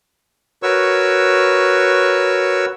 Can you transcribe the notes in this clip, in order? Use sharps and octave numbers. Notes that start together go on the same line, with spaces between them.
F#4 A#4 B4 C#5 C#6 E6